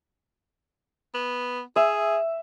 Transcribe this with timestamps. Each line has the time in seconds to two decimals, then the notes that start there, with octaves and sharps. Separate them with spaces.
1.15 B3
1.76 G#4 E5